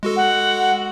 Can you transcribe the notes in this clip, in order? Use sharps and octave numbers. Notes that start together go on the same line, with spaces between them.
G#3 F#4 A4
F#5